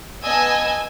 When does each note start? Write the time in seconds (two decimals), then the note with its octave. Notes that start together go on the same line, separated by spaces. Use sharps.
0.24 B3 D#5 G#5 A5 E6 G#6